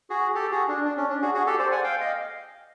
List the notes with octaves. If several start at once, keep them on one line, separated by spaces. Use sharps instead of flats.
F#4 G#4
G4 A4
F#4 G#4
D4
D4
C#4
D4
F#4 G#4
F#4 G#4
G4 A4
C5 D5
F#5 G#5
F5 G5
D#5 F5